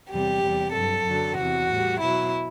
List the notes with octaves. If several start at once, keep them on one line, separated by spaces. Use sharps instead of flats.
E2 C3 G3 G4
E2 C3 G3
G2 F#3 A4
F#2 D3 F#3
E2 C3 E3 F#4
A2 G3
B2 F#3 E4